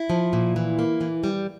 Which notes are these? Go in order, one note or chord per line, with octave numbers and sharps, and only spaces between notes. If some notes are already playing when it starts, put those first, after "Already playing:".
Already playing: E4
F3
A#2
E3
A#3
E3
G3